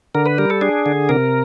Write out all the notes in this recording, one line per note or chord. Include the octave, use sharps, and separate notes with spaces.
D3 A#4
B4
G3 A#4
A4
D4 G#4
D3
C3 A#4